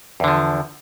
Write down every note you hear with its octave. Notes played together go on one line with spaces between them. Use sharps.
E2 D3 F3